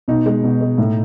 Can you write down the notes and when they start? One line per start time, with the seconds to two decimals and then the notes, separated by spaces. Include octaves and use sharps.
0.08 B2 D#4
0.26 G#3
0.43 B2
0.61 G#3
0.78 A2